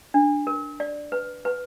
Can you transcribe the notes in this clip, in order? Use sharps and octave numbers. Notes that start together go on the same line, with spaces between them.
D4
A#4
D5
B4
B4